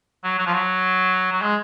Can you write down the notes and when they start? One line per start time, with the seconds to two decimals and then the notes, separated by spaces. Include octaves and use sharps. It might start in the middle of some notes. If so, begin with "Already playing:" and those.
0.24 F#3
0.39 F#3
0.47 F3
0.53 F#3
1.32 F#3
1.42 G#3